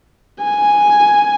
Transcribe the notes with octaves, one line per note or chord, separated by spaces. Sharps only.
G#5